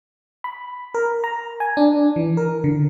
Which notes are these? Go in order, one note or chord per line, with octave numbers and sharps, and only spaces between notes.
B5
A#4
A#5
G#5
D4
E3
A#4
D3